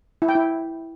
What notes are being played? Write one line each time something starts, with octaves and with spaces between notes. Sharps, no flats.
E4
G5
E4